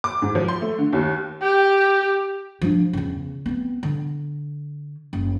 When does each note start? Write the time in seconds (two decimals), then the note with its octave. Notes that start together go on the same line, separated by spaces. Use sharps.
0.04 D6
0.22 G#2
0.35 F3
0.48 C6
0.61 A3
0.78 D3
0.93 D#2
1.42 G4 G5
2.62 F3 D4
2.93 E2 C#3
3.46 B3 C4
3.83 D3
5.13 F#1